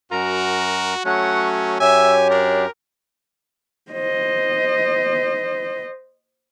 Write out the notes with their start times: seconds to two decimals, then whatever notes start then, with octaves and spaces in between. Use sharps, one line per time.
0.12 F#2 F#4 A#4 A#5
1.05 F#3 A3 C#4 F#4 F#5
1.80 F#2 G4 C#5 E5 G#5
2.30 D4 A#4
3.92 C5 D#5